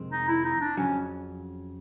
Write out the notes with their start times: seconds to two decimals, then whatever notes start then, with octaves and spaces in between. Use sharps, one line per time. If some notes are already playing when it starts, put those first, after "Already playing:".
Already playing: F2 C3 D#3 G#3 C4
0.11 D#4
0.28 E4
0.45 D#4
0.61 D4
0.77 F2 C#3 F#3 C#4